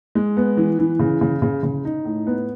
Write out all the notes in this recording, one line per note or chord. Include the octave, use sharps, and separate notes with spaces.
G#3
B3
E3
E3
C#3
C#3
C#3
C#3
D#4
A2
B3